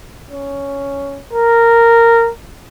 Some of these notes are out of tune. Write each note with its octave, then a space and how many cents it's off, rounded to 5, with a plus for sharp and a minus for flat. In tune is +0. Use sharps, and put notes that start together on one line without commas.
C#4 +5
A#4 -10